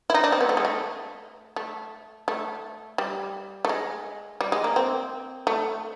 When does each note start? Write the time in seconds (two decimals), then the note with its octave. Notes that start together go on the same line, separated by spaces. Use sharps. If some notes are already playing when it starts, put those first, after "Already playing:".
0.10 E4
0.14 D#4
0.24 D4
0.32 C4
0.41 B3
0.49 A3
0.57 G#3
0.65 A3
1.56 A3
2.28 A3
2.98 G3
3.65 A3
3.69 G#3
4.41 G3
4.52 G#3
4.64 A#3
4.76 C4
5.47 A3